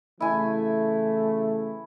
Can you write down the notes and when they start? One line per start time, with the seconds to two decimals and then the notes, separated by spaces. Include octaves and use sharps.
0.20 C#3 E3 A3 E4 G#5